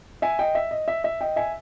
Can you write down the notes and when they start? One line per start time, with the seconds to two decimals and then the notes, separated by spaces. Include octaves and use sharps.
0.22 E5 G#5
0.39 D#5 G5
0.55 E5
0.71 D#5
0.88 E5
1.04 E5
1.21 D#5 G5
1.36 E5 G#5